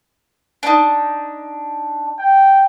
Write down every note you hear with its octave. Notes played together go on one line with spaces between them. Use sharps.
D4 D#4
G5